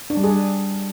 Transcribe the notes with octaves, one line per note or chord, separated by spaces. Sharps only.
D4
G3
G#4